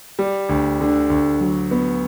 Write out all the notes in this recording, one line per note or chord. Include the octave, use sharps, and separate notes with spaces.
G3
D2
D3
D2
F#3
B3